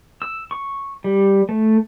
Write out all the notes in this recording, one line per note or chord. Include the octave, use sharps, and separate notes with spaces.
E6
C#6
G3
A3